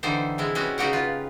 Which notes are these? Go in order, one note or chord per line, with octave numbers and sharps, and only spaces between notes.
D3 E3 G3 D#4 A4 C5
C3 G#3 E4
G3 G#3 B3 C#4 F#4
C#3 G3 D#4 F#4 G4 F#5
F4 B4